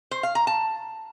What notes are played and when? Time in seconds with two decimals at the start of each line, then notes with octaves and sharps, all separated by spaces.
0.11 C5
0.23 F5
0.35 A#5
0.47 A5